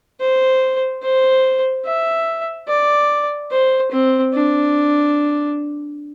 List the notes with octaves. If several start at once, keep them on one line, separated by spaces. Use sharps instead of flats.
C5
C5
E5
D5
C5
C4
D4